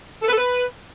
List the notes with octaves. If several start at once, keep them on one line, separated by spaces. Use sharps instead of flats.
A4
B4
A4
B4